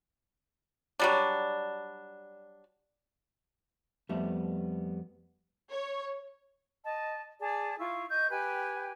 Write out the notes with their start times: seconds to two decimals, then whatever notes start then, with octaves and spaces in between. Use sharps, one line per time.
0.99 F#3 G3 D4
4.09 F2 G3 A3 B3 E5
5.71 C#5
6.84 D#5 A5
7.40 G#4 D5 A5
7.79 E4 F4 C#6
8.09 D#5 C#6 G6
8.30 G4 B4 G5 G#5